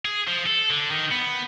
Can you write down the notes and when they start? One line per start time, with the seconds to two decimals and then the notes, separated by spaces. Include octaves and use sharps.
0.05 G#4
0.27 F3
0.46 A4
0.70 D3
0.91 D#3
1.11 B3